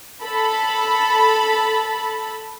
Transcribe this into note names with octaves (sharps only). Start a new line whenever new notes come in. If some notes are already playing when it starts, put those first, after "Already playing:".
A4 B5